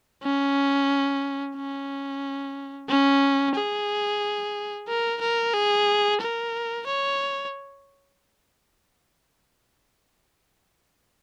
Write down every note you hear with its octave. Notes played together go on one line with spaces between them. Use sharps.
C#4
C#4
C#4
G#4
A#4
A#4
G#4
A#4
C#5